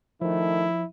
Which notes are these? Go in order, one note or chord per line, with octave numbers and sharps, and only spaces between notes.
D#3 F3 A3 E4